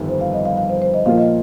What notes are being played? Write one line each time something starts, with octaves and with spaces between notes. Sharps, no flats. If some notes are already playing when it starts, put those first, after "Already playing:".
Already playing: G1 F2 D#3 G3
C5
F5
D#5
F5
F5
C5
C5
D#5
A#2 F3 A#3 F4 F5
D#5